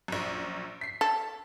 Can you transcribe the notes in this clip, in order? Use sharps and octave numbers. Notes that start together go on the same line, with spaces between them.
A#1 F#2
B6 C7
A4